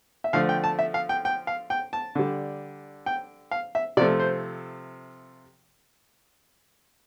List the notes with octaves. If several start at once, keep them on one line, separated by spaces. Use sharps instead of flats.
E5
D3 F3 A3 F5
G5
A5
E5
F5
G5
G5
F5
G5
A5
D3 G3
G5
F5
E5
C3 F3 A3 D5
C5